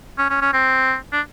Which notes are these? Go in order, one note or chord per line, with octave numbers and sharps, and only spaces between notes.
C#4
C#4
C#4
C4
D4